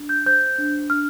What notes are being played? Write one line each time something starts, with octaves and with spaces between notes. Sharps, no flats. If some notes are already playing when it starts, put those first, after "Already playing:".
Already playing: D4
G6
C5 G6
D4
D4 F6